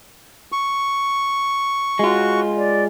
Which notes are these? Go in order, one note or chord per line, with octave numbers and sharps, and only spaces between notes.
C#6
G#3 F4 F#4
D5